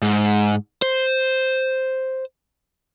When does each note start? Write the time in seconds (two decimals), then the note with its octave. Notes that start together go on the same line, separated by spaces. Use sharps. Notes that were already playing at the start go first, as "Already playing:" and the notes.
0.02 G#2
0.82 C5